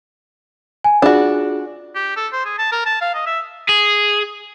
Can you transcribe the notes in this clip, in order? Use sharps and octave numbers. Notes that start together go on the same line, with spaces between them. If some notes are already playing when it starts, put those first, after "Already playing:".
G#5
D4 F4 F#4 G#4
G4
A4
C5
G#4
A5
A#4
A5
F5
D#5
E5
G#4